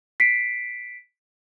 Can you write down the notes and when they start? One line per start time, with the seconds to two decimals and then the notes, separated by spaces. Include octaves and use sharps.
0.20 B6 C7 D7